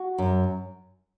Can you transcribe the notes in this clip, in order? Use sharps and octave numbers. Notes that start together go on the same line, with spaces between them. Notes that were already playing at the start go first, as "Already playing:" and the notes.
Already playing: F#4
F#2